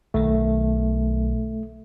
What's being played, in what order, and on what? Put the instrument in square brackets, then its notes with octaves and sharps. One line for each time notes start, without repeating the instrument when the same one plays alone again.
[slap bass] B1 D#3 [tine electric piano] A3